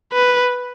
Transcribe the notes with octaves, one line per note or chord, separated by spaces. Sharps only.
B4